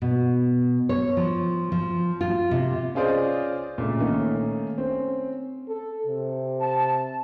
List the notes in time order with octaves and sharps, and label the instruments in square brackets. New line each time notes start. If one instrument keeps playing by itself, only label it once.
[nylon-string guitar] B2
C#5
F3
F3
F4
C3
[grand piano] C#4 F4 G#4 C5 D5 D#5
A#2 C#3 A3
D#3 A3 A#3 C#4 D#4
C4 C#4
[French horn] A4
C3
[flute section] A5